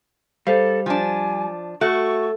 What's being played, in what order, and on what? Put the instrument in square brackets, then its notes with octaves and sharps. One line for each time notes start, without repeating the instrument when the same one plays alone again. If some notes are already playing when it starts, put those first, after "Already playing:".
[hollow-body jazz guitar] G3 [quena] A4 [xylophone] C5 F5
[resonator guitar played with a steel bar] F3 D4 [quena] G#5
[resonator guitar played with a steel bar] A3 [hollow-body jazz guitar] F#4 [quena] C#6 [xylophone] F#6